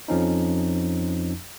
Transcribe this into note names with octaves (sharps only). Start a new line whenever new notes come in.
F2 F3 C#4 D#4